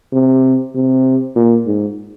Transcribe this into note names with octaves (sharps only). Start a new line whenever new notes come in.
C3
C3
A#2
G#2